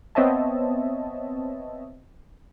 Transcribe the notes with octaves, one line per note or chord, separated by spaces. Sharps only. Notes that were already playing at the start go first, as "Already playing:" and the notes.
B3 C4 C#5 D#5 E5 A5